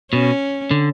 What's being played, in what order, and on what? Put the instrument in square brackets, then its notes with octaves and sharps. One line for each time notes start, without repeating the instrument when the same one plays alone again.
[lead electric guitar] B2 [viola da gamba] C#4
[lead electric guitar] D3